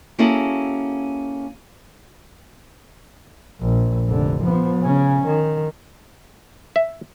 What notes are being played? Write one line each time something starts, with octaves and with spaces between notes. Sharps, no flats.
A#3 C#4 E4 F#4 G#4 A4
A#1
F1 D3
F3 B3
C#3 C#4
D#3
E5